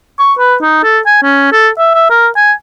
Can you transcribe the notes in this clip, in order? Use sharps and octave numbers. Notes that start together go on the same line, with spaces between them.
C#6
B4
D#4
A4
G#5
C#4
A4
E5
E5
A#4
G#5